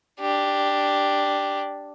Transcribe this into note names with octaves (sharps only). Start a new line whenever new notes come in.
D4 G4